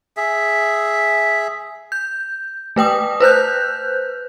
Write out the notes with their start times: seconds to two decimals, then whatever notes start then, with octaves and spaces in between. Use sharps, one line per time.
0.17 G#4 E5
1.92 G6
2.76 A3 B4 G5 D#6
3.20 B4 C5 F#6 G6